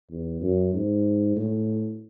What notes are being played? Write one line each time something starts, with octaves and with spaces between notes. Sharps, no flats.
E2
F#2
G#2
A2